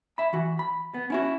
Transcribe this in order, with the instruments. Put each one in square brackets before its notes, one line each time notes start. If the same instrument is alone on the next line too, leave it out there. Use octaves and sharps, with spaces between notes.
[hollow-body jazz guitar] E5 B5
E3 F#4
B5
B3
C#4 E4 F#4